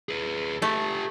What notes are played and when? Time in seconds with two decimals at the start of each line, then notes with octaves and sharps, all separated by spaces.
0.09 G#4 B4
0.62 A3 G4 A4